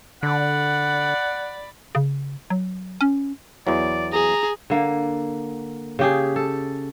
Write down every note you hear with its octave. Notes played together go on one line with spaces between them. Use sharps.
D3 D5 F#5 B5
C#3
F#3
C#4
E2 E3 F#3 D5
G#4 A#5
D3 A#3
C#3 G4 G#4
A4